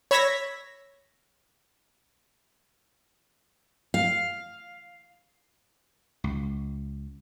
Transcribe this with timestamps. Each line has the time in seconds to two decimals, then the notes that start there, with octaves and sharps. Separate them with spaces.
0.11 C#5 B5 E6 G#6 A#6 B6
3.94 F5
6.24 C#2